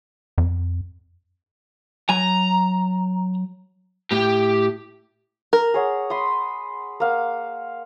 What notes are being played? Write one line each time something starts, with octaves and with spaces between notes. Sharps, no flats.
F2
F#3 G#5 A#5
A2 G4
A#4
G#4 C#5 F#5
B5 C6 D#6
A#3 F5 F#5